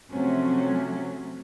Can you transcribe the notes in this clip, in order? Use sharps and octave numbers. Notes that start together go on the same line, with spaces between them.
C3 F3 F#3 A3 C4 C#4